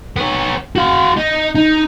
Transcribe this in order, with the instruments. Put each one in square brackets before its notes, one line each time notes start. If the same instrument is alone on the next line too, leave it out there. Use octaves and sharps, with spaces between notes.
[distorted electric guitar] B3 C#5
F#4 F5
D#4
D#4